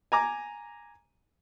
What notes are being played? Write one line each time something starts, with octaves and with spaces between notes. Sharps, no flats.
G#5 A#5 D6